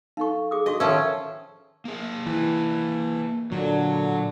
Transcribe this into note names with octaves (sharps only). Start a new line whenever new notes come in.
D#4 A4 F5 C#6
G#4 D6 D#6
D4 F#4 D#5 C#6
D#3 F3 C#4 A4 C#5 E5 A#5 E6
A#3 G#4
E3
A#2 D3 F#3